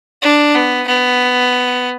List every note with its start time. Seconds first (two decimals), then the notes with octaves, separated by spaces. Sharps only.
0.22 D4
0.55 B3
0.87 B3